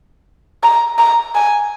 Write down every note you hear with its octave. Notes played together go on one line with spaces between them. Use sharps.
A#5
A#5
G#5